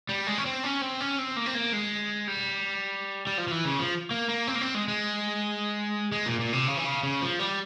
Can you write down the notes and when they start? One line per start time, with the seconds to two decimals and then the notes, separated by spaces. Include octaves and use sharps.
0.09 G3
0.27 G#3
0.38 C#4
0.45 C4
0.64 C#4
0.81 C4
1.01 C#4
1.19 C4
1.36 A#3
1.46 C4
1.54 A#3
1.73 G#3
2.27 G3
3.27 G3
3.38 F3
3.48 F3
3.51 E3
3.65 C#3
3.79 F3
4.11 A#3
4.29 A#3
4.47 C4
4.55 A#3
4.61 C4
4.75 G#3
4.88 G#3
6.12 G#3
6.26 A#2
6.39 A#2
6.53 C3
6.67 C#3
6.77 E3
6.85 C#3
7.03 C#3
7.21 F3
7.39 G3